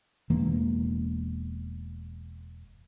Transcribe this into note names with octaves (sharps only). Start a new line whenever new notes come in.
E1 E3 A#3